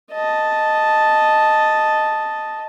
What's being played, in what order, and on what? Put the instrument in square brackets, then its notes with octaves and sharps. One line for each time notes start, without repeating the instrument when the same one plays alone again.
[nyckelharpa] D#5 A5